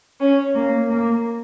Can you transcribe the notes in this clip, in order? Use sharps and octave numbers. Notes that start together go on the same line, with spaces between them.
C#4
A#3
A#3